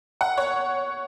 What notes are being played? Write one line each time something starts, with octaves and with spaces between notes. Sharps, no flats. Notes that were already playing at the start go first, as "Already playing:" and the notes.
F#5
C#5